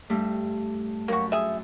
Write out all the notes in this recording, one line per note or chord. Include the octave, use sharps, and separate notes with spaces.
G2 A3 D4
F#2 A#3 F#4
G#4 E5